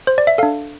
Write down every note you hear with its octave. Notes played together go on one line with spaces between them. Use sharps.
C5
D5
E5
D4 A4 F5